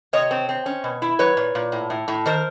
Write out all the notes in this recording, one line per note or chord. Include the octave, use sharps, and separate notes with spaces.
C3 C#5 D#5
C4
C4
C#4
B2
E4
F#3 B4 C#5
A#2
A#2
A2
A2
A2
D#3 A#4 C5